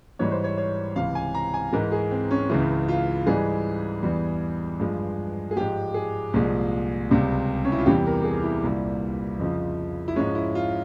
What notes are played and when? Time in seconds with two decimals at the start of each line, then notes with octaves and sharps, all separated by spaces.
0.19 G#2 E3 G3 C#5
0.31 C5
0.44 C#5
0.58 C#5
0.96 C#2 C3 E3 F5
1.15 G#5
1.34 A#5
1.54 G#5
1.73 G#2 E3 G#3 A#4
1.92 G#4
2.11 C4
2.31 C#4
2.50 C#2 C#3 E3 E4
2.88 F4
3.26 G#2 E3 G3 G#4
4.03 E2 E3 G3
4.80 G2 F3 G#3
5.51 G#4
5.56 G#2 F3 G#3 G4
5.94 G#4
6.34 C2 A#2 F3 G#3
7.10 C#2 C3 G3
7.65 C#4
7.72 E4
7.78 F4
7.86 E2 C3 E3 G3 G4
8.06 A#4
8.24 G#4
8.43 E4
8.63 C2 A#2 G3
9.39 F2 C#3 F3
10.08 E4
10.16 G#2 F3 G#3 C#4
10.35 E4
10.55 F4